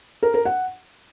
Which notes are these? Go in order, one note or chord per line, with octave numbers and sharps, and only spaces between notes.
A#4
A#4
F#5